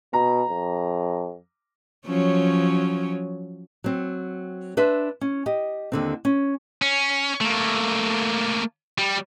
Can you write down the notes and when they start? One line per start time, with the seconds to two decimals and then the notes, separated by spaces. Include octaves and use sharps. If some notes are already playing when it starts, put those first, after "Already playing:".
0.13 B2 A#5
0.49 F2
2.07 F3 F#3 C#4
3.84 F#3 C4
4.77 D4 B4 C5 E5
5.21 C#4
5.46 G4 D#5
5.92 D#2 D3 C4
6.25 C#4
6.82 C#4
7.41 A3 A#3
8.98 G3